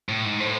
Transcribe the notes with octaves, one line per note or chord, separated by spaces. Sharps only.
A2
G#2
A2 C5